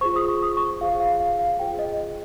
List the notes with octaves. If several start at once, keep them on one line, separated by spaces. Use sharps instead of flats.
F4 G#4 C5 C#6
D#6
C#6
D#6
C#6
F4 G#4 C5 F5
F5
F5
F5
F4 G#4 C5 G5
D#5